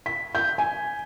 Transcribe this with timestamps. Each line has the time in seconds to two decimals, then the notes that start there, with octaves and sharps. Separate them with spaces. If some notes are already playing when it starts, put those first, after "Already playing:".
0.06 B6
0.35 G6
0.58 G#5